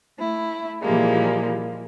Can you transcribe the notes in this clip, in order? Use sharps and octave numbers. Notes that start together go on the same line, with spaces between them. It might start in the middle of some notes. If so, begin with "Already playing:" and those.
A3 E4
A#2 E3 F3 G3 G#3 A#3